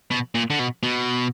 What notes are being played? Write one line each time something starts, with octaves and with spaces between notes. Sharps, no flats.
B2
A#2
D3
B2
B2